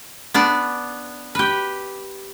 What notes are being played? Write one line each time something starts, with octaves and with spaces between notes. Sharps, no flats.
B3 D4 D5
G4 B4